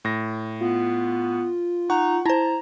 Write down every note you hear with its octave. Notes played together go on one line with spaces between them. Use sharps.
A2 A#6
B3 F4
D#4 F#5 C#6
E4 C5 A5 A#5 A#6